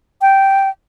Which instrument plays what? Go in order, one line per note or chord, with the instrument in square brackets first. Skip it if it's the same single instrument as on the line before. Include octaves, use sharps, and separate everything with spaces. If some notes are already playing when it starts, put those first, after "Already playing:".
[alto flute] G5